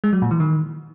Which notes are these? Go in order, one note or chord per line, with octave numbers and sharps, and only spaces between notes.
G#3
F#3
A#2
E3
D#3